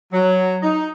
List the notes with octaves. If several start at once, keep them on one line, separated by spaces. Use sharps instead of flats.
F#3
D#4